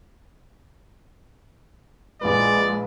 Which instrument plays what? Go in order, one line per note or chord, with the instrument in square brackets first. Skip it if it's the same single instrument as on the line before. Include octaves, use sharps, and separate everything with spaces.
[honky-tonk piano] A#1 E4 B4 [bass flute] G#3 [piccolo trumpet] D5